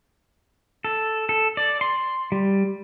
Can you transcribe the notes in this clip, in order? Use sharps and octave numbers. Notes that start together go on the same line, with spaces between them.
A4
A4
D5
C6
G3